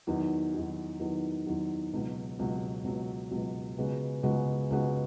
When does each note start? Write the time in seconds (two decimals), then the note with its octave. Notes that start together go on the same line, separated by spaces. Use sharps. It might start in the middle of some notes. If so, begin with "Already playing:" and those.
0.07 E2 D#3 F#3
0.54 E2 D#3 F#3
0.99 E2 D#3 F#3
1.46 E2 D#3 F#3
1.93 C#2 B2 F#3
2.39 C#2 B2 F#3
2.84 C#2 B2 F#3
3.31 C#2 B2 F#3
3.78 C#2 C#3 G#3 B3 F#4
4.23 C#2 C#3 G#3 B3 F#4
4.70 C#2 C#3 G#3 B3 F#4